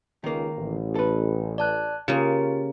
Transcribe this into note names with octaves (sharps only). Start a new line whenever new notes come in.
C#2 D#3 A#3
A1
A4 B4
D5 A5 F#6
C#3 A#3 F4 G4